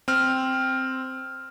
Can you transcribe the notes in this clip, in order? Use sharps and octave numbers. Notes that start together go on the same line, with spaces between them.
C4 F6